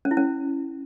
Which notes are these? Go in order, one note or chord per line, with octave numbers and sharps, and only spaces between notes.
C#4
E4
C#4